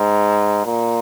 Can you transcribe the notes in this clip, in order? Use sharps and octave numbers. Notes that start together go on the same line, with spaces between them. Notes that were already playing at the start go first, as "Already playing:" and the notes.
Already playing: G#2
A#2